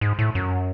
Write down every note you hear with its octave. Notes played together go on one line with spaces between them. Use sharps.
G#2
A2
F#2